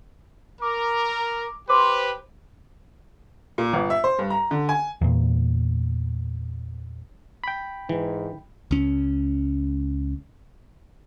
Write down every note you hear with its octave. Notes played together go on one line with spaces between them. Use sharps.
A#4 D6
G4 B4 C5 C6 D6
A#2
G1
E5
C5
G2
A#5
D3
G#5
E2 A#2
G5 B5
G#2 E3
C#2 C#4